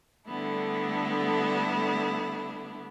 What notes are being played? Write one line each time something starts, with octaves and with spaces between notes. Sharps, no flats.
D3 G3 A3 B3 D4 E4